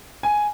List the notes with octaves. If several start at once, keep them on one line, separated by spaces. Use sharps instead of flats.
G#5